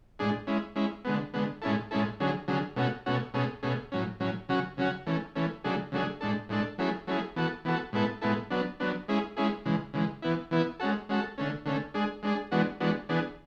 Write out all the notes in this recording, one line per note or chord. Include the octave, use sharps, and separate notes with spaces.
A2 G#3 D4 G#4
G#3 C#4 E4
G#3 C#4 E4
D3 G#3 B3
D3 G#3 B3
A2 G#3 C#4 E4 A4
A2 G#3 C#4 E4 A4
D3 F#3 C#4 G#4
D3 F#3 C#4 G#4
B2 A3 C#4 F#4
B2 A3 C#4 F#4
B2 A3 C#4 G#4
B2 A3 C#4 G#4
A2 F#3 C#4
A2 F#3 C#4
C#3 F#3 C#4 F#4
C#3 F#3 C#4 F#4
E3 A3 C#4
E3 A3 C#4
C#3 F#3 A3 D4 G#4
C#3 F#3 A3 D4 G#4
A2 G#3 D4 A4
A2 G#3 D4 A4
F#3 A3 C#4 E4 G#4
F#3 A3 C#4 E4 G#4
E3 B3 F#4 A4
E3 B3 F#4 A4
A2 G#3 B3 E4 A4
A2 G#3 B3 E4 A4
F#3 B3 D4
F#3 B3 D4
G#3 C#4 E4 G#4
G#3 C#4 E4 G#4
C#3 E3 G#3
C#3 E3 G#3
E3 B3 E4
E3 B3 E4
G#3 C#4 F#4 A4
G#3 C#4 F#4 A4
D3 A3 C#4
D3 A3 C#4
G#3 D4 G#4
G#3 D4 G#4
E3 G#3 B3 D4 F#4
E3 G#3 B3 D4 F#4
E3 B3 D4 G#4